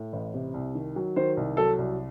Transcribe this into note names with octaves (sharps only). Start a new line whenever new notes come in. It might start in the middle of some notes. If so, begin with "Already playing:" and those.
Already playing: A2
A1
C3
C2
D#3
F#3
D#3 C5
C2
F#3 A4
C2